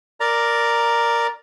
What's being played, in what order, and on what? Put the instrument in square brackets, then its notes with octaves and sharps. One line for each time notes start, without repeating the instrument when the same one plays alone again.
[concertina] A#4 D5 A#5